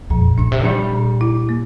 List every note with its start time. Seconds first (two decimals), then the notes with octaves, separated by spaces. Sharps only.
0.10 F2 A#2
0.38 A2 D4
0.52 C3
0.65 G3 D4
0.94 A#2
1.21 E4
1.49 A#3